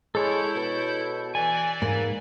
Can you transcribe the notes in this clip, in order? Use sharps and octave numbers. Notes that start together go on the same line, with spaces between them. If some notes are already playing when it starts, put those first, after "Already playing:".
G#3 E4 A4 C#5 G6
B2
E3 D5 G#5
G#2 A#3